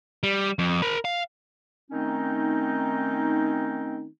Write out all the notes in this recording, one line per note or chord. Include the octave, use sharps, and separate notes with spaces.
G3
F2
A#4 B5
F5
D#3 A3 C4 C#4 D#4